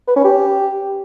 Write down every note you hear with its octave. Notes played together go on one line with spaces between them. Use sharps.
B4
C#4
G4